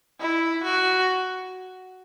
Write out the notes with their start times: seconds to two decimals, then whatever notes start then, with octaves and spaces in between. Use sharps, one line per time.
0.20 E4
0.63 F#4